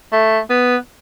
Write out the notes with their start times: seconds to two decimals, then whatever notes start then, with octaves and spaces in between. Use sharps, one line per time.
0.13 A3
0.50 B3